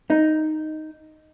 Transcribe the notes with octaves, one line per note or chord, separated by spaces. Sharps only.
D#4